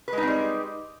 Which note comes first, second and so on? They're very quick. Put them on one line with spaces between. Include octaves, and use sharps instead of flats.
B4 G#3 D#4 C4 G3